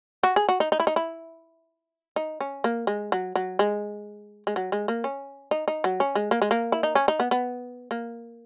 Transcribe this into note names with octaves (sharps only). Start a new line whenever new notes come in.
F#4
G#4
F#4
D#4
D#4
E4
D#4
E4
D#4
C#4
A#3
G#3
F#3
F#3
G#3
G#3
F#3
G#3
A#3
C#4
D#4
D#4
F#3
C#4
G#3
A#3
G#3
A#3
E4
D#4
C#4
D#4
B3
B3
A#3